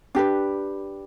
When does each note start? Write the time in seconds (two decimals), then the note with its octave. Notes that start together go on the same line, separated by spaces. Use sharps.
0.15 D4 G4 B4